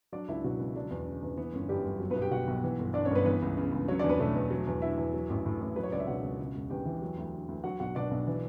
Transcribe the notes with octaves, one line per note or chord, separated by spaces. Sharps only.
F#3 D4 D5
C#2 E4 E5
B2 F#3 F#4
C#2
D3 F#3 D4
E2
C#3
E2
E3 B3
G1 C#4
F#2 G3 G4
G1
F#3
B3 B4
B1
G4 G5
B2 F#4 F#5
B1
E3
G1
G2 D4 D5
C#4 C#5
G1 B3 B4
E3 B3 B4
C#2
C#3
C#2
F#3 C#4 C#5
D4 D5
E2
B3 B4
B2 A3 A4
E2
F#3
E2
D3 E4 E5
E2
F#3
A1
A2
A1
F#3 B4
C#5
C#2 D5
E5
B2 F#4 F#5
C#2
C#3
E1
E2 G4 G5
E3
F#3
D2
D3
D2
F#3 F#4 F#5
B1 F#4 F#5
B2 D4 D5
B1
E3